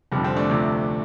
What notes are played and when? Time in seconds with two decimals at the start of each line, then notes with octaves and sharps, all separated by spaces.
0.12 F1 F2 D3 F3 G3
0.24 G3 C4
0.36 A3 D4
0.49 D2 C3 F3